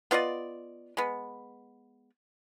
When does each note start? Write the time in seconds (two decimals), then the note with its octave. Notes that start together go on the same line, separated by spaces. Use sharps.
0.11 B3 F4 D5 D#5
0.97 G#3 B3